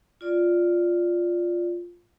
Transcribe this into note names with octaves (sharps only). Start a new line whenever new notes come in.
F4 D5